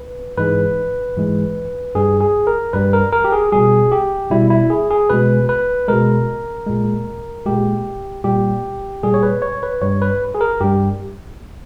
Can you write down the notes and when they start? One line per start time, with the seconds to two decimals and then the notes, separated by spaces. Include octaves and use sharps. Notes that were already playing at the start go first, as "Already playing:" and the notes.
Already playing: B4
0.37 G#2 E3 G#3 B4
1.16 G#2 E3 G#3
1.95 G2 G3 G#4
2.21 G#4
2.47 A#4
2.73 G2 G3 B4
2.93 A#4
3.13 A#4
3.24 G4
3.33 G#4
3.52 B2 G3 G#4
3.92 G4
4.31 B2 G3 E4
4.50 E4
4.70 G#4
4.90 G#4
5.10 B2 G#3 B4
5.49 B4
5.88 B2 G#3 A#4
6.66 A#2 G#3
7.46 A#2 G#3 G4
8.24 A#2 G3 G4
9.03 A#2 G3 G#4
9.14 C#5
9.23 B4
9.42 C#5
9.63 B4
9.82 G2 G3 C#5
10.02 B4
10.35 G#4
10.41 A#4
10.61 G2 G3 G4